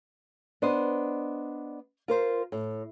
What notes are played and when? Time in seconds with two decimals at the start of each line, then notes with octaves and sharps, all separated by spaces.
0.62 B3 D4 C5 D#5
2.08 F4 A#4 C5
2.52 A2